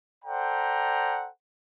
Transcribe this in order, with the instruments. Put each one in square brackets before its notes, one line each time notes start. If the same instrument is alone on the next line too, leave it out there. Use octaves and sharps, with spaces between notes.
[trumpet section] A4 C5 D5 F#5 G5 A#5